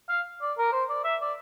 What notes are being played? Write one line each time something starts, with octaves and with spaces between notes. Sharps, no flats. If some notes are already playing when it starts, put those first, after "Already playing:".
F5
D5
A#4
C5
D5
E5
D5